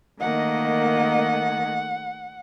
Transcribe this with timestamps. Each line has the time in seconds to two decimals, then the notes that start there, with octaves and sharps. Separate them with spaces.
0.21 D#3 A3 A#3 D#5 F#5